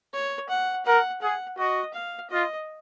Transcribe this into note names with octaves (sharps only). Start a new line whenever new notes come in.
C#5
F#5
A#4 F#5
G#4 F#5
F#4 D#5
F5
F4 D#5